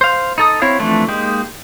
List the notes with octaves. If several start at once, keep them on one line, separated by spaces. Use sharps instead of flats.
C5 F5
D#4 A4 D#6
C4 E4 C#5 F5
E3 F3 A3 C4 D4
G#3 A#3 D#4 G4